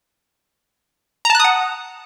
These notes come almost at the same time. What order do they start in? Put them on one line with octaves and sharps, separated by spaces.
A#5 A5 F#6 D#6 F#5